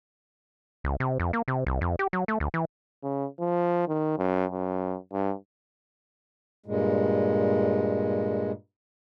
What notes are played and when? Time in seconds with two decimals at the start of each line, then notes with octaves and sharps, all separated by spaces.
0.84 C#2
1.00 C3
1.20 F2
1.33 A#3
1.48 C3
1.67 C2
1.81 F2
1.99 G4
2.13 F#3
2.28 A3
2.40 D2
2.54 E3
3.03 C#3
3.39 F3
3.88 D#3
4.18 F#2
4.51 F#2
5.13 G2
6.66 G2 A#2 G#3